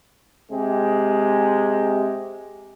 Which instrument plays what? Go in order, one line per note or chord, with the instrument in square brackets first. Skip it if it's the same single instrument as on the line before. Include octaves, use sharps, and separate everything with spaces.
[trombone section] C3 G#3 G4